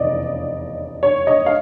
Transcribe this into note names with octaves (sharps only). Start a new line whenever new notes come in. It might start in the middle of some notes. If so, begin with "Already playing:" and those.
Already playing: F1 E2 C#3 D5 D#5
C#5
D#5
F5